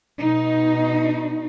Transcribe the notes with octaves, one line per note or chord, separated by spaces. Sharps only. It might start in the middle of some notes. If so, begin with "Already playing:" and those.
B2 D#4